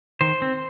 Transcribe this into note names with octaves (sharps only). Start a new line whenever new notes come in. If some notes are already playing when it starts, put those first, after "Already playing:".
D#3 C5
C4